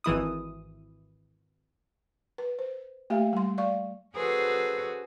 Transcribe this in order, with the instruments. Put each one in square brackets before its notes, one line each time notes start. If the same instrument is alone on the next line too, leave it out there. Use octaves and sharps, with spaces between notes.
[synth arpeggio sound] G#1 E3 E4 D#6
[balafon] B4
C5
A3 A#3 G4 E5 F5
G3 C6
D5 F5 C#6
[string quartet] C#4 F#4 G#4 A4 B4 C5